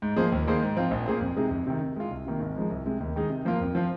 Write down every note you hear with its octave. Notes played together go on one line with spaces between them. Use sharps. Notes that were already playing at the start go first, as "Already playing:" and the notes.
G#2
F3 A#3 G#4 C5
D#2
D#3 A#3 G#4 C5
G#2
F3 C4 F4
A#1
A#2 A#3 G#4 C5
F2
C3 G#3 D#4 G#4
F2
C3 D#3
C3
G#3 F4
C2
C3 D#3 A#3
G#1
G#2 F3 G#3
C2
C3 G#3
D#2
D#3 G#3 D#4 G#4
C3
F3 A#3 F4 A#4
F2
F3 C4 F4